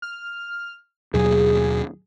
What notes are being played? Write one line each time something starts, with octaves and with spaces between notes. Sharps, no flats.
F6
D#2 B2 F#3 G#4